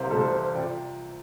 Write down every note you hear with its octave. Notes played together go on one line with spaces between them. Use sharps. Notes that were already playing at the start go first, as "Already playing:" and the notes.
Already playing: C2 C3 G3 C5 F5
C2 C3 G3 A4
C5
C5
C5
C3 F3 D5 G5